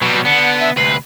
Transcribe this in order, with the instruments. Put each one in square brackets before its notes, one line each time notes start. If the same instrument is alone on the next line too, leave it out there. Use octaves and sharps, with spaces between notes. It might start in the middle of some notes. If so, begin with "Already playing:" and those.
[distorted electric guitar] B2 [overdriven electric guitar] F#3 G3
[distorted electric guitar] D3 [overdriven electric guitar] B3 [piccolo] C#7
[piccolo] E5
[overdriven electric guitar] D2 C3 [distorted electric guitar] B4 [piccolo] C7